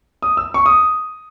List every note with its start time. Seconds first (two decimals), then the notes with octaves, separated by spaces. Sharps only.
0.22 D#6
0.37 E6
0.54 C#6
0.66 D#6